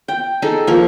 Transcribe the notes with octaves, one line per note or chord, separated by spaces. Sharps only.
G5
D#4 G#4 A4
F3 A#3